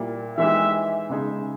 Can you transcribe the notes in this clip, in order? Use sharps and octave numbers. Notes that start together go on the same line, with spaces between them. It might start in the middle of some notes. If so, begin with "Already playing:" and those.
Already playing: A#2 G3 A#3 E4
E3 G#3 D#4 G4 E5
C#3 G#3 D#4 G#4